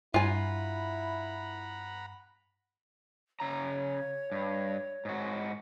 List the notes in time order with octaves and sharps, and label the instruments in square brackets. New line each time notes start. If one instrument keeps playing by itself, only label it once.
[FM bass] G2 [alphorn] E4 [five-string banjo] F4 G#5 [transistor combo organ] F#5 A#5 B5
[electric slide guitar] C#3 A#5 [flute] C#5
[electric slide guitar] G2
G#2 F#4